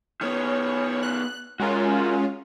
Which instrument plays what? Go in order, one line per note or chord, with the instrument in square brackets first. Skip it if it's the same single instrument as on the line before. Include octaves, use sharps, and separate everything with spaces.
[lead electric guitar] D#3 B3 [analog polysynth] C#5
[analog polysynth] F#6
[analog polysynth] G#3 C#4 F4 [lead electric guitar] F#4 A#4